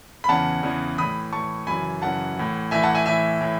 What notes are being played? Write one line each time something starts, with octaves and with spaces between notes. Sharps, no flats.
B5
E2 C#3 E3 F#5 A5
E2 C#3 E3
A2 E3 B5 D#6
A2 E3 A5 C#6
F#2 C#3 E3 G#5 B5
F#2 C#3 E3 F#5 A5
A2 E3
A2 E3 E5 G#5
F#5 A5
E5 G#5
A2 E3 E5 G#5
A2 E3